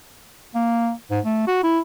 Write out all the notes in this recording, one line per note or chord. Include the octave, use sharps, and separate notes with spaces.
A#3
G#2
A3
F#4
E4